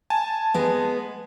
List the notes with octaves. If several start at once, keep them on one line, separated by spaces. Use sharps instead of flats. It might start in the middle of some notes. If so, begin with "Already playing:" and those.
G#5 A5
G#3 B3